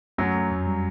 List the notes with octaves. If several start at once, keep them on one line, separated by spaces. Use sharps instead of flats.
F#2 F#3 A3
A3
F2
G3